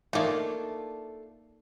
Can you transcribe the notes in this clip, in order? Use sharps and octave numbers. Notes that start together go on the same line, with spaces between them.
A3 A#3 D4 D#4 F4